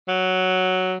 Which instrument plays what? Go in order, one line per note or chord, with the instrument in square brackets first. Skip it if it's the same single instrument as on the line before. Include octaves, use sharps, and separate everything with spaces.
[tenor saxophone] F#3